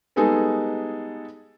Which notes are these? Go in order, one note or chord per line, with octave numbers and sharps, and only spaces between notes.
G3 G#3 B3 D#4 G#4 A4